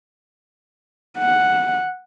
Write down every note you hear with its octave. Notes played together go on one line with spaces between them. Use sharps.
F#5